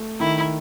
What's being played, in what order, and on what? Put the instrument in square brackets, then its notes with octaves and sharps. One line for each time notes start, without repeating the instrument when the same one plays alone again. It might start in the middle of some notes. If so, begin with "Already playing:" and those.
Already playing: [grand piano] A3
[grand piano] D#3 [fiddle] E4